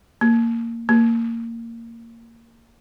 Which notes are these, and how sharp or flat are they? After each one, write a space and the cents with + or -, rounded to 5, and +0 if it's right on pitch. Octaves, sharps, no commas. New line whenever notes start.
A#3 -15
A#3 -20